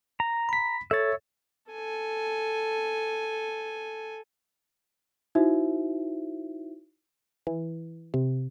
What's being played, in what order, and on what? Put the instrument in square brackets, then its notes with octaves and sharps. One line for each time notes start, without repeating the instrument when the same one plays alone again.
[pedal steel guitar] A#5
[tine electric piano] B5 B6
[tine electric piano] A4 A6 [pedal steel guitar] C#5 E5
[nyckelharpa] A4 G#5
[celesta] D#4 E4 F#4 C5 E5
[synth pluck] E3
C3